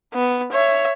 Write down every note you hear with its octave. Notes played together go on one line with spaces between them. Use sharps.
B3
C#5 E5